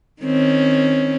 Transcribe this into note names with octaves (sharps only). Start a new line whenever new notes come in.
D#3 C4 C#4